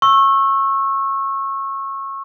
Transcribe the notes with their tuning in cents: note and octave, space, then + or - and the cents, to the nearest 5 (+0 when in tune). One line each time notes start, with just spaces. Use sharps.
C#6 -25 E6 +0